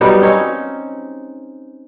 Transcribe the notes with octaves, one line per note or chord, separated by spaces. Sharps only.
F#3 G3 B3 D#4
C4 C#4 D#4